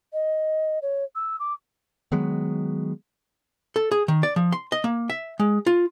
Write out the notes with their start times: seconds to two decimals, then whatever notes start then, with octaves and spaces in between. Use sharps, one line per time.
0.13 D#5
0.82 C#5
1.16 E6
1.40 D6
2.12 D#3 F#3 G#3 B3
3.76 A4
3.92 G#4
4.08 D#3
4.23 D5
4.36 F3
4.52 C6
4.72 D#5
4.84 A#3
5.10 E5
5.39 G#3
5.66 F4